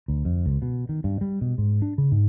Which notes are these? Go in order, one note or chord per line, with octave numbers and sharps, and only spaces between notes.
D2
F2
C#2
B2
D#3
G2
G3
B2
G#2
D4
C#3
G#2